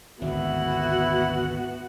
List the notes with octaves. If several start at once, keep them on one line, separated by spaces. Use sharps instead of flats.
G#1 D2 A2 B3 E4 F#4 F#5